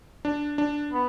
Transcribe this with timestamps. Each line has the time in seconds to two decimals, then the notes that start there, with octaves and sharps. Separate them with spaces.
0.25 D4
0.58 D4
0.93 B3